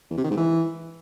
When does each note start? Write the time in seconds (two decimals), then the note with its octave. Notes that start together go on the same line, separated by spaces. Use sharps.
0.11 E2
0.17 C3
0.24 D#3
0.31 G#2
0.37 E3